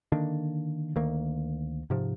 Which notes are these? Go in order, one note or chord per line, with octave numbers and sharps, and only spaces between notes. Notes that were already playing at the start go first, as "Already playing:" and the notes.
D3 D#3 A#3 D4
D2 D#3 A#3
G#2 C3 F3